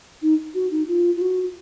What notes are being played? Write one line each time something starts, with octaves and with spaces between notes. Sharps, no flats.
D#4
F#4
D#4
F4
F4
F#4